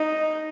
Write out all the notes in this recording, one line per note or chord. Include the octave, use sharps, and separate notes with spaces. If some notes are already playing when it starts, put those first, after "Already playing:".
Already playing: D#4